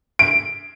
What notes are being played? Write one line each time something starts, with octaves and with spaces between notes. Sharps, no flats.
D7